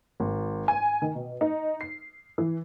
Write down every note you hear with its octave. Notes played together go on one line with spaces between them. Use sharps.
G#1
G#5
D#3
B2
D#4
C7
E3